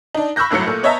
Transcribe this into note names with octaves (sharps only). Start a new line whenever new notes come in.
D4 D#4
B5 C#6 E6 F#6 G6 A#6
G1 C2 A2 F#3 C#7
A#2 A3
B3 C#5 D#5 E5 A5 A#5